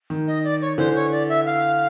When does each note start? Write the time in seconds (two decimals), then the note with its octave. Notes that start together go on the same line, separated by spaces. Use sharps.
0.10 D#3
0.27 D#5
0.44 D5
0.61 C#5
0.78 D3 E3 C5
0.95 C#5
1.12 D5
1.29 E5
1.46 F5